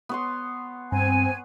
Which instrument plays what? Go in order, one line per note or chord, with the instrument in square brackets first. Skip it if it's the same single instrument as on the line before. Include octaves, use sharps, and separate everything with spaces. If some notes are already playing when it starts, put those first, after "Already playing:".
[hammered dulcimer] B3 C#5 C6
[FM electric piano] G2 [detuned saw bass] C4 [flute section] G#5